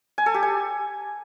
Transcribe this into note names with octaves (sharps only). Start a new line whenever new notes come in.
G#5
A4
G4
G#5